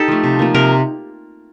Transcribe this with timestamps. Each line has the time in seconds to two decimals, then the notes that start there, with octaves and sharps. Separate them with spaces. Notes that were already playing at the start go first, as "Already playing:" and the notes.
Already playing: D#4 G4 A4
0.08 F3 A3
0.24 C3
0.39 F3 A#3
0.54 C3 A#4